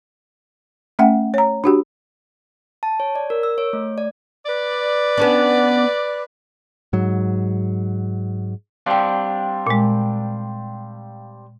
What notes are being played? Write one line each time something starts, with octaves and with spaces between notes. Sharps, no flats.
A3 C#4 E5 F#5 G5
C#5 A#5
D4 F#4 G4
A5
C#5
D5
A#4
E6
C#5
A3
D5
B4 D5
B3 C#4 D4
G#2 F#3
G3 C4 D4 F5 G5
A#2 G#3